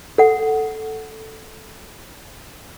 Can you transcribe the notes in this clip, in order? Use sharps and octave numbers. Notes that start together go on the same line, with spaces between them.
A4 F#5